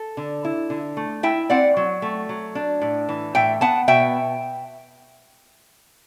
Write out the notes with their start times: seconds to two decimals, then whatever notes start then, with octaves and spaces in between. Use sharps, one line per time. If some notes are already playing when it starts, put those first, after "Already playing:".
Already playing: A4
0.17 D3
0.45 E4
0.70 D3
0.97 A3
1.23 E4 E5 G5
1.50 C4 D5 F#5
1.77 F#3
2.02 A3
2.29 F#3
2.55 D4
2.82 A2
3.09 E3
3.35 A2 E5 G5
3.61 B3 F#5 A5
3.88 B2 E5 G5